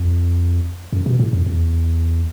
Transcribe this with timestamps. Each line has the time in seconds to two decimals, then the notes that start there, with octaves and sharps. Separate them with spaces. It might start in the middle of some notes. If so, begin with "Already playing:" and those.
Already playing: F2
0.93 F#2
1.06 B2
1.19 A2
1.33 F2
1.46 E2